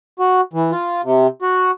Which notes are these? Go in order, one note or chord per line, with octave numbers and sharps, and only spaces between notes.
F#4
E3
F4
C3
F#4